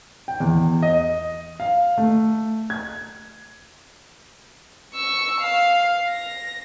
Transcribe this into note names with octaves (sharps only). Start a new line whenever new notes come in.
G5
E2
D#5
F5
A3
G#6
C#6 E6
F5
A#6